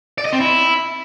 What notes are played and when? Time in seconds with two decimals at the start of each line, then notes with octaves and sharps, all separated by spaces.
0.18 D5
0.25 D#5
0.33 C4
0.40 E4